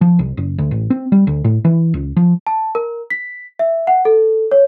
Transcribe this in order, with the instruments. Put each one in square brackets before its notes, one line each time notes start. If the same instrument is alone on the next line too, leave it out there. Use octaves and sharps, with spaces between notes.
[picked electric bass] F3
C2
F#1
D2
A1
C4
G3
D2
A2
E3
C#2
F3
[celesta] A5
A#4
B6
E5
F#5
A4
C#5